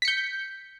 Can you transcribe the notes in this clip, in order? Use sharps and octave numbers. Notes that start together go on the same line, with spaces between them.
G6 B6 C#7